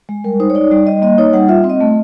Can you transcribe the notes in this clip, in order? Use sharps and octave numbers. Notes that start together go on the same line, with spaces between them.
G#3
G3 A#4
D#4 C5
C#5
D#4 D5
G3 D5
G3 D#5
A#3 D#5
D#4 C#5
G3 F#5
F4 E5
C4
D#5
A3